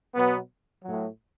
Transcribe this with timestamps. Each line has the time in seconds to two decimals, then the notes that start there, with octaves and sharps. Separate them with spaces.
0.15 B2 F#3 B3
0.82 F#3
0.87 A2